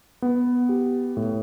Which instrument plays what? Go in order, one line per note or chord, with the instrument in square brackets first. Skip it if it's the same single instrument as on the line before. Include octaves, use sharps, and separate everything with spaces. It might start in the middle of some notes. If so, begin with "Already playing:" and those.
[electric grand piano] B3
G4
A2